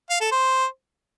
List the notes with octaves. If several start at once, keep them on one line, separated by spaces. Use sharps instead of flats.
F5
A4
C5